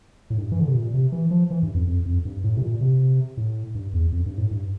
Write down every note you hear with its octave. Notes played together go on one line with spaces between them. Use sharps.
A2
G2
E3
D3
C3
A#2
C3
E3
F3
E3
G2
F2
F2
F2
G2
A2
C3
A#2
C3
A2
G2
E2
F2
G2
A2
G2